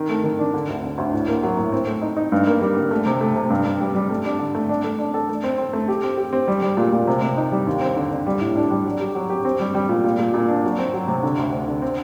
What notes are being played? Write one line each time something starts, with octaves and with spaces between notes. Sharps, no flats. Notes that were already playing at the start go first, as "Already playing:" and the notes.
Already playing: D#3
A3
D#3
D4
D3
D2
D3
D2
A2
A#3
F#3
A2
C4
A3
D#4
D#4
G2
A#3
G3
D3
A3
C3
A3
C3
G2
G2
G3
G3
A3
D4
D3
A3
D4
A3
D4
A4
A3
C4
C4
A3
G4
C4
G4
C4
G3
G3
A#2
A#2
C3
C3
D#4
G3
D#2
C4
D3
D3
G3
A2
D4
G3
F#3
G4
F#3
G4
C4
G3
G3
A#2
A#2
A#2
A#2
D4
F#3
C4
F#3
C3
D3
D2
D2
D3
C4